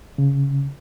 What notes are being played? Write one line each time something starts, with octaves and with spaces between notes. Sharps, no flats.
C#3